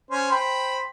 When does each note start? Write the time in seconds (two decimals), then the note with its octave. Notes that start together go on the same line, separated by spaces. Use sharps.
0.11 C#4 C5
0.31 C5 G5 B5